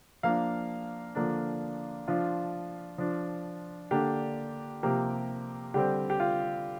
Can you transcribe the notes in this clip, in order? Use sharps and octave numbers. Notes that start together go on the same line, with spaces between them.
F3 A#3 D4 F5
D3 F3 A#3 D4
F3 D4 F4
F3 D4
D3 A#3 D4 G4
C3 F3 A#3 G4
D3 G3 C4 G4
G4
F4